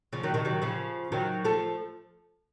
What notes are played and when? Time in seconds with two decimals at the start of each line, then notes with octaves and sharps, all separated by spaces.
0.13 C#3 F3
0.23 D#3 F#3
0.34 C3 D#3
0.45 D#3 F#3
0.62 C#3 F3
1.12 D#3 F#3
1.45 F3 A3